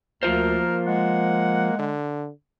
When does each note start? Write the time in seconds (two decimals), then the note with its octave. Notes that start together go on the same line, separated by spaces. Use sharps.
0.23 D2 F3 A#3 F4 A#4 C5
0.87 G#3 F#5
1.79 D3